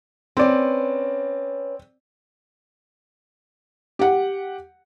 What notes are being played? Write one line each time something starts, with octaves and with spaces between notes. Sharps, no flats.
C4 C#4 B4 D5
G4 F#5